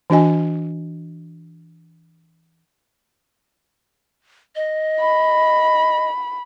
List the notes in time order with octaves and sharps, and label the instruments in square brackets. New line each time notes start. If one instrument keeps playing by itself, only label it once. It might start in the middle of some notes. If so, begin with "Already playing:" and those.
[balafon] E3 D4 F#4 D#5 G#5
[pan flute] D#5
[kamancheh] B5